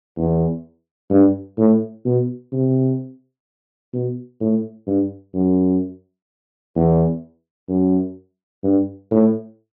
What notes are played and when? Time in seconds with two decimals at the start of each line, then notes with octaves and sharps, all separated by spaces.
0.17 E2
1.10 G2
1.58 A2
2.05 B2
2.53 C3
3.93 B2
4.40 A2
4.87 G2
5.34 F#2
6.76 E2
7.69 F#2
8.64 G2
9.11 A2